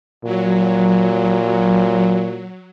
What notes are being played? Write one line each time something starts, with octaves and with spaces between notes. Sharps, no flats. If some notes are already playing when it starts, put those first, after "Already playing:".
A#2 F#3